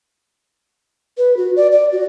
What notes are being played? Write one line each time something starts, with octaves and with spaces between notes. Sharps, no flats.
B4
F#4
D5
D5
F#4